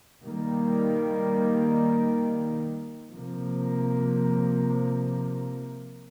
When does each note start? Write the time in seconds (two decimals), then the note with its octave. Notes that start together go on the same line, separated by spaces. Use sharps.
0.23 D#3 G3 A#3
3.12 C3 F3 A#3